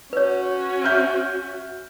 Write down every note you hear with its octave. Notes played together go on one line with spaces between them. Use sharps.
C#4 F#4 B4 C#5
E5 F6 G6